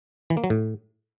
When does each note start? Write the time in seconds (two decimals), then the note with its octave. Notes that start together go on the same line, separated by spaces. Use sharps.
0.30 E3
0.37 A#3
0.44 F#3
0.50 A2